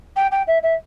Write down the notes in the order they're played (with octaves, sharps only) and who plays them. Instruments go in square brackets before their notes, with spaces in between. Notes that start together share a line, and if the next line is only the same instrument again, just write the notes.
[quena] G5
G5
E5
E5